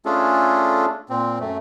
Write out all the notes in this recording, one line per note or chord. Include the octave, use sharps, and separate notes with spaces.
A3 C#4 D4 F4 G#4 A4
A#2 C4
F#2 A3